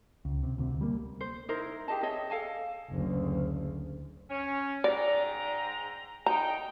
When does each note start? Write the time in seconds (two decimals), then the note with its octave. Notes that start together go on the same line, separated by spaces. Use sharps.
0.25 C#2
0.43 C3
0.58 D2 C3
0.81 G3 A#3
1.21 C5
1.49 D#4 E4 A#4 C5
1.88 G4 G#4 D#5 A5
2.03 G#4 C#5 D#5 E5
2.30 A4 F5 G#5 A5
2.91 F#1 D2
4.30 C#4
4.84 G#2 D5 G5 A#5
6.26 D#4 G5 A#5